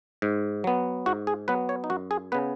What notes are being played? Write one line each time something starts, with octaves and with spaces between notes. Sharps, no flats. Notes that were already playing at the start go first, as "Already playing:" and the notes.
G#2
F#3 B3
G#2 F#4
G#4
F#3 B3 B4
C#5
D#4
F#2 F#4
G#4
C#3 B3 B4